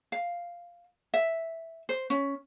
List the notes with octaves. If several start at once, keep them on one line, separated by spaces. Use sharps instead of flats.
F5
E5
C5
C#4